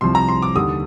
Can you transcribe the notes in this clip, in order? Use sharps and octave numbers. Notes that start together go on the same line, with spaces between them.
C2 C3 F3 C6
A#5
C6
D6
D#2 D3 G3 D#6